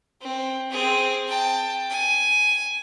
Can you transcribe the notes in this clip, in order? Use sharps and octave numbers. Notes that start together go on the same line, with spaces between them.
C4
C4 G#4
G5 A5
G#5